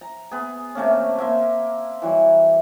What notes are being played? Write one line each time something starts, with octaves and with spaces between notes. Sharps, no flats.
A#5
B3 G#4
C3 A3 A#3 C#4
A#3 E5 C6
E3 F#3 G3